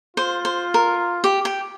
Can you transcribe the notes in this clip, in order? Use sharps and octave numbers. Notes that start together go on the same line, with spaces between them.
F4 C5
C5
A#4
G4
G4